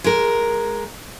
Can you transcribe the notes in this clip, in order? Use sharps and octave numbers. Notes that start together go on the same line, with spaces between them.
G#3 A#4